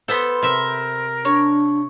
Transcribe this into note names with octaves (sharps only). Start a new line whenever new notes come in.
B3 A4 C5 B5
C3 A#4 E5
D4 C#5